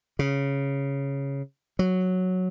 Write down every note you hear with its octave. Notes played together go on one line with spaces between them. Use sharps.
C#3
F#3